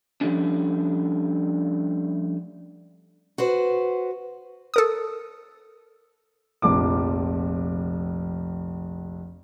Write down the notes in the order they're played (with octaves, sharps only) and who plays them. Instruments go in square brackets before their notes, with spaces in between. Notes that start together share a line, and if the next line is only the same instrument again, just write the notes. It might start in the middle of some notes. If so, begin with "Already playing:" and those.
[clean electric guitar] F3 G3 A3 C#4 D4
[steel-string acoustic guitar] F#4 B4 C5
[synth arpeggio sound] A4 A#4 D#6
[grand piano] F1 A#1 F3 D6